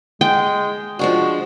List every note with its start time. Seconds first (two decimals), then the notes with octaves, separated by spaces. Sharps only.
0.21 G#3 G5
0.99 F3 G#3 D4 F#4